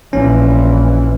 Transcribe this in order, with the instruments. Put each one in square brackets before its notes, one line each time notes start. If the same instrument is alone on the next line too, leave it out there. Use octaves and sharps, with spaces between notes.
[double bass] A#1 E3 [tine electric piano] C#4